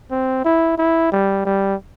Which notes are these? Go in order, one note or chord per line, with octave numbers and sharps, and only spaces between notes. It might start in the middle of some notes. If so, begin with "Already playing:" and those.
C4
E4
E4
G3
G3